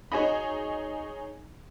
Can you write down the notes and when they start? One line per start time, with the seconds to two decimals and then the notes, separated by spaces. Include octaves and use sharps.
0.12 D#4 F#4 G#4 C#5 D#5 B5